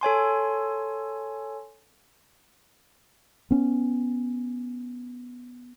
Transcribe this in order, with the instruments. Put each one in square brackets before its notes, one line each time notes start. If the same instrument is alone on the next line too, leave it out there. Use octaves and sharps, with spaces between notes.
[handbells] A4 C#5 G#5 C6
[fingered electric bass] B3 C#4